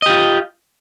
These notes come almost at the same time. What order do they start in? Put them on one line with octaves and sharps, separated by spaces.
D#5 G4 F4